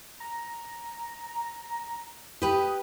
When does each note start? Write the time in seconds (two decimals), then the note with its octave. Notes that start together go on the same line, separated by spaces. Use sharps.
0.20 A#5
2.42 G4 B4 D#6